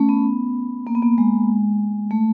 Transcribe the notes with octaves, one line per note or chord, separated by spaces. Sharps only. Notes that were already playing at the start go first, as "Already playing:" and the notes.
Already playing: A3 C#4
B3
A#3
B3
A#3
G#3
A3